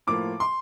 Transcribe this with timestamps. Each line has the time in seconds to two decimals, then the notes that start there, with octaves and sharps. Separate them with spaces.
0.07 A2 F3 A#3 D6
0.40 C6